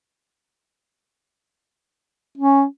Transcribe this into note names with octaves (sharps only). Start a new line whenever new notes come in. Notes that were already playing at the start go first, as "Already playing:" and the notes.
C#4